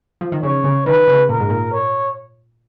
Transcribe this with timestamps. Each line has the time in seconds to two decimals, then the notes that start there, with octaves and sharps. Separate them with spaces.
0.21 F3
0.32 D#3
0.43 C#3 C#5
0.64 C#3
0.86 D#3 B4
1.08 C#3
1.29 A#2 A#4
1.40 G#2
1.50 A#2
1.72 C#5